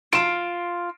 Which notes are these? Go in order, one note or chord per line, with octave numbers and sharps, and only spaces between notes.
F4 D7 E7